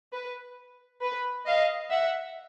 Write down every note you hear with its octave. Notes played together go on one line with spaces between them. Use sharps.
B4
B4
D#5 F5
E5 F#5